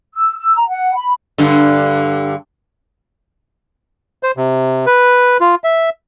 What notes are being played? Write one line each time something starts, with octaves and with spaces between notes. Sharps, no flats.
E6
E6
A#5
F#5
B5
G2 D3
C5
C3
B4
F4
E5